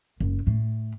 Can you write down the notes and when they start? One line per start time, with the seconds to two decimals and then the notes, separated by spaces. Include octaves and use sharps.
0.20 F#1
0.47 A2